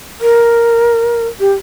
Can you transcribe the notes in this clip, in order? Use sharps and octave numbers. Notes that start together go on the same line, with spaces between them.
A#4
G4